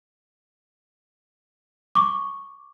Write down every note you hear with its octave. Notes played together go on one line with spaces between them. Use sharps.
C#6 D6